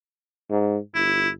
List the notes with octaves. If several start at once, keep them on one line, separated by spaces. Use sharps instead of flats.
G#2
G1 E4